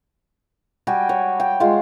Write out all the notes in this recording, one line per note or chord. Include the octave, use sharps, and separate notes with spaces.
G3 F#4 G5 G#5
C#5
G5
G#3 F4